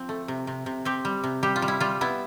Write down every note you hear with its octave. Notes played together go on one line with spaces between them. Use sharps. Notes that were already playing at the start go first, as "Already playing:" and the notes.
Already playing: F3 C4
A3
C3
C3
C3
C4 G4
G3
C3
G3 G4
F4
G3
E4
G3 F4
B3 E4